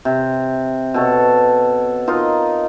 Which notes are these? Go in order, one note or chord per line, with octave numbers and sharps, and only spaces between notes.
C3
B2 A4 C#5
D#4 F4 A#4 D#5